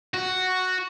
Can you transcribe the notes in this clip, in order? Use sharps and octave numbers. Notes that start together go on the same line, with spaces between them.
F#4